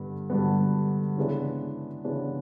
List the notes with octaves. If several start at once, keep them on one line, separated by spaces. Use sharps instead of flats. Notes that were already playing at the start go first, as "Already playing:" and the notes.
Already playing: G2 D3 G3 B3
G2 D3 G3 B3
C#3 E3 G#3 B3 D4
C#3 E3 G#3 B3 D4